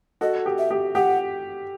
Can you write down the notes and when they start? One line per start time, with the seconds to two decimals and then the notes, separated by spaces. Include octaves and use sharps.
0.21 F#4 A4 D#5
0.46 G4
0.58 E5
0.71 G4
0.95 G4 F#5